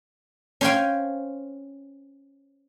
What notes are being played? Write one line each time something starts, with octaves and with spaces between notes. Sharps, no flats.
C#4 C5 C#5 F5 G5 G#5